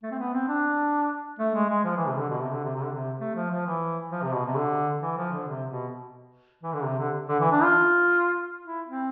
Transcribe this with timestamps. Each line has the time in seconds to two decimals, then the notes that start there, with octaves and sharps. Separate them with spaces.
0.03 A3
0.11 C4
0.19 B3
0.33 C4
0.48 D4
1.39 A3
1.55 G#3
1.69 G#3
1.84 F3
1.96 E3
2.07 C3
2.19 D3
2.30 B2
2.41 C3
2.52 D3
2.64 C3
2.75 C3
2.83 D3
2.92 C3
3.20 A3
3.36 F3
3.51 F3
3.66 E3
4.11 F3
4.23 C3
4.34 B2
4.46 C3
4.57 D3
5.02 E3
5.17 F3
5.32 D3
5.48 C3
5.70 B2
6.63 E3
6.74 D3
6.84 C3
6.99 D3
7.29 D3
7.40 E3
7.52 D4
7.63 F4
8.65 E4
8.88 C4